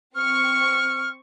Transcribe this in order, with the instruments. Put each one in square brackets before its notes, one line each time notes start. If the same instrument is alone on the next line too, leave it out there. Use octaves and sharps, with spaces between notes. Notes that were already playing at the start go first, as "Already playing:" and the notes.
[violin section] C4 C#6 [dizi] F6